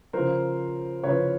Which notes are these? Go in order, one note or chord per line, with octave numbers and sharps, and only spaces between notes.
C#3 F3 A#4 C5
C#3 F3 B4 C#5